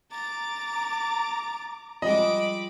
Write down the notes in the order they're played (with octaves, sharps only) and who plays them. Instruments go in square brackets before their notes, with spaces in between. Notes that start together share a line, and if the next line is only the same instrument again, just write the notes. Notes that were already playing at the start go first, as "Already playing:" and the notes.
[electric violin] A#5 D6 [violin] A6
[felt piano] F3 G3 G#3 [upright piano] D#5 [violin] B5 D6